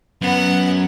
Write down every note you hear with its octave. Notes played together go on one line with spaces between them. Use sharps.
F#2 B3 F#5